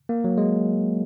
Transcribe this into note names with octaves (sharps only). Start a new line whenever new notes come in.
A#3
F#3
G#3